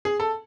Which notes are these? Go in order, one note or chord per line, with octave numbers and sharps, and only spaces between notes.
G#4
A4